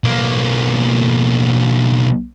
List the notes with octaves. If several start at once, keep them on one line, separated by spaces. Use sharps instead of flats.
B1 A#3